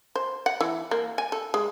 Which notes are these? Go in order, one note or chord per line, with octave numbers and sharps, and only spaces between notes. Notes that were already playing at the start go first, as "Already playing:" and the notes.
C5
F#5
E3
A#3
G#5
A4
G#3